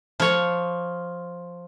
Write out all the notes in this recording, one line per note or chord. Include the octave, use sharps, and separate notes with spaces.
F3 C#5